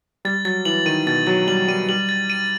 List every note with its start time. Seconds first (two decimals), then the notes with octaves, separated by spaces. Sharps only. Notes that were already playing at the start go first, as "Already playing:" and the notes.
0.25 G3 A6
0.45 F#3 A6
0.65 E3 F#7
0.86 D#3 D#7
1.06 B2 A6
1.27 F#3 A6
1.48 G3 F#7
1.68 G3 D#7
1.89 G3 F#7
2.09 A6
2.30 D#7